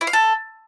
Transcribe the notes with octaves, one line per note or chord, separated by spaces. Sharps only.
E4
F5
A4